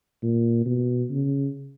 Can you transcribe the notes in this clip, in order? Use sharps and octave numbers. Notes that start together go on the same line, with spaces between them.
A#2
B2
C#3